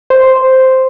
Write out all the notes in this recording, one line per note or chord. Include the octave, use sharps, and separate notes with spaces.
C5